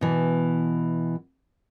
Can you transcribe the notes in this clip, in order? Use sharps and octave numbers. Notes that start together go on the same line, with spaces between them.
B2 E3